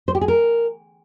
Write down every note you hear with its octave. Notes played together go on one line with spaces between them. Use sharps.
C5
G4
G#4
A#4